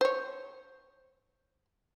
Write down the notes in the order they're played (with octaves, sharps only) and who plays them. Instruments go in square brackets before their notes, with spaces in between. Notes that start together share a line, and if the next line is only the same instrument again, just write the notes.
[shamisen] C5 C#5